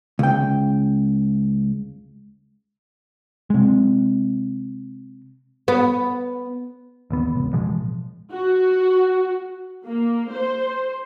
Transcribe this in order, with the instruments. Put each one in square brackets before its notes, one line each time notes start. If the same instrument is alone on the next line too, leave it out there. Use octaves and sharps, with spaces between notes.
[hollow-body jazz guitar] C#2 G5
[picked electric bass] C3 G#3
[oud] B3
[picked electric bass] A1 D#2 B3
F1 C#2
A1 B2 F3 G#3
[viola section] F#4
A#3
C5